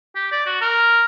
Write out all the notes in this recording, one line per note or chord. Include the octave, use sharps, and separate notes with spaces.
G4
D5
F#4
A#4